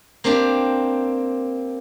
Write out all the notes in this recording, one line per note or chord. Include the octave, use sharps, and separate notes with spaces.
A#3 C4 D4 G4